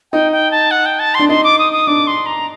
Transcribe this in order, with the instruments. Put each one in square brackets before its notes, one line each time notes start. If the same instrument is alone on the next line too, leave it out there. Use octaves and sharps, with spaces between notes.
[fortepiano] D#4 [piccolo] G5
[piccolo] G5
A5
F#5
G5
A5
[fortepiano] D4 [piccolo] C6
[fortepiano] D#4 [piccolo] C6
[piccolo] D6
D#6
D#6
[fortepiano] D4 [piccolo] D6
[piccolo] C6
A#5